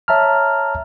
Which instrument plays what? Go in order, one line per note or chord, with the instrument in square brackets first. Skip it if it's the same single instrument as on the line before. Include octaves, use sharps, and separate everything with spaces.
[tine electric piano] C#5 E5 A5 A#5 F6